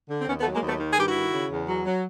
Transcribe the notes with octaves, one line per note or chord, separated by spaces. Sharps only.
D3
C4
D#2 B3 C#4
A3 B3
F#3
G#3 A#3
D#2 A3 B3
D#3
G#4
G2 G4
E4 F#4
D#3
C#3
E2
F#3
F#3